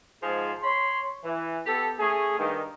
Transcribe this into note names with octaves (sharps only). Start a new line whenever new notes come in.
G#2 F3 G#4
C#5 B5 C6
E3
B3 G4 A4
A3 C#4 G#4
G2 D#3